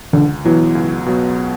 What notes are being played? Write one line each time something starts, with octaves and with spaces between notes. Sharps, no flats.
C#2 D3
B2 E3 F#3 B3
C#2
B2 F#3 B3